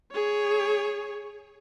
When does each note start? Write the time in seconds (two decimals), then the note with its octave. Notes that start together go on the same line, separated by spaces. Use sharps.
0.12 G#4 C#5